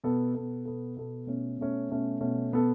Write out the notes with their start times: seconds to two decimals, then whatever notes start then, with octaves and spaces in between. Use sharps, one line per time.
0.04 B2 B3 A4
0.34 B2 B3 A4
0.65 B2 B3 A4
0.97 B2 B3 A4
1.27 B2 A3 C#4
1.58 B2 A3 C#4
1.89 B2 A3 C#4
2.20 B2 A3 C#4
2.52 B2 B3 A4